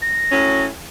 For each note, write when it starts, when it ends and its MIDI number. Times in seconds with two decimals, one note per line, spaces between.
0.02 0.65 94
0.32 0.66 45
0.32 0.66 54
0.32 0.66 61